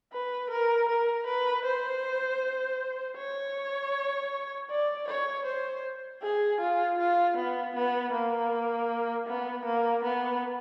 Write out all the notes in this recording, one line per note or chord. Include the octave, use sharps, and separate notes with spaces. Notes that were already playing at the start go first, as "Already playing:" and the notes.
B4
A#4
A#4
B4
C5
C#5
D5
C#5
C5
G#4
F4
F4
B3
B3
A#3
B3
A#3
B3